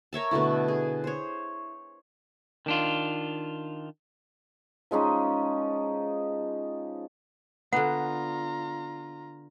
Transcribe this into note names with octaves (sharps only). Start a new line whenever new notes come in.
A#4 C#5 E5 A5
B2 D3 A3 E4
G#4
C5 C#5
D#3 D4 F4
F3 G#3 C#4 D#4
D3 B3 F4 F#5 A#5